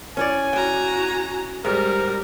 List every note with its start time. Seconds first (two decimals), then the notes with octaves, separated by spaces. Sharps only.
0.17 C#4 E4 C#5 D5 G#5
0.53 F#4 G5 A#5
1.65 G#2 G3 A#4 C5